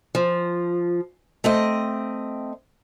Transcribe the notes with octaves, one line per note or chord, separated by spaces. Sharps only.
F3
A3 C4 D#5